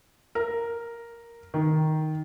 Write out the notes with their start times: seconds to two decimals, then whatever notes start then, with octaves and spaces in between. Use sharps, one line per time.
0.35 A#4
1.54 D#3